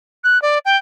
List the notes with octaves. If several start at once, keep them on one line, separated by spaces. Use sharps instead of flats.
F#6
D5
G5